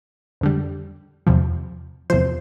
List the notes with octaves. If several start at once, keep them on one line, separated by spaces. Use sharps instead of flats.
F2 D3 G3
E2 C3 F3
E2 C3 F3 C5